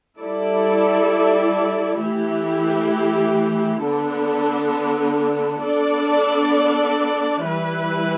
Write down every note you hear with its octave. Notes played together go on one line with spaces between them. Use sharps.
G3 E4 A4 D5
E3 A3 E4 G4
D3 B3 D4 A4
B3 D4 A4 D5
E3 G3 E4 B4